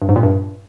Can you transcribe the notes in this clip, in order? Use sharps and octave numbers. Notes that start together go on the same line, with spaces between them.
G2
G#2
A#2
G2